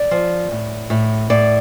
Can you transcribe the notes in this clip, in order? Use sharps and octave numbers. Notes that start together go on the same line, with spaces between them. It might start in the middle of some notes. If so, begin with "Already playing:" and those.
Already playing: D5
F3
A2
A2
A2 D5